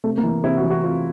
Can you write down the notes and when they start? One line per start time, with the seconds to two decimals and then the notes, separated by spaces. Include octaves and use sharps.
0.04 C3 A3
0.18 A#3
0.23 E3
0.43 C3 E4
0.57 F#4
0.64 E3
0.70 F#4
0.84 C3 F4